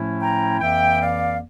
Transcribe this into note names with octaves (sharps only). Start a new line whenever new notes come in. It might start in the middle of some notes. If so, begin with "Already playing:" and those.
Already playing: A2 F3 A3 C#4 E4
G5 A#5
F2 E3 A#3 E5 G5
D5 F5